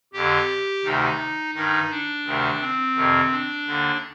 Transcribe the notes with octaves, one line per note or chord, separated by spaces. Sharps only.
F2 D3 G4
D2 C3 D#3 D#4
G2 D#3 D#4
D4
D2 C3 D#3
C4
F2 C3 D#3
D4
D#2 D3